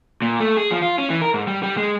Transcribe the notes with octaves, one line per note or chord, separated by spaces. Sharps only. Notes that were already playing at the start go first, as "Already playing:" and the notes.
A#2
A3
G#4
F3
F4
C#4
E3
A#4
G#2
G3
G3
G#3